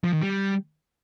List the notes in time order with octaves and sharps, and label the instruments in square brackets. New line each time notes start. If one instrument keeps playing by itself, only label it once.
[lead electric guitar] F3
D#3
G3